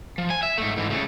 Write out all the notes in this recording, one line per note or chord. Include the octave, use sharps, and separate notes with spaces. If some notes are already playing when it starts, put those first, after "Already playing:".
F3
G#5
E5
G#2 A3
G#2 E3
C#3 A3